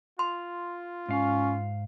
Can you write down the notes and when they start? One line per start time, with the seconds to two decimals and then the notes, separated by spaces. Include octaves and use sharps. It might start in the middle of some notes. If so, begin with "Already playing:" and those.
0.19 F4 C6
1.09 G#2 C#4 F5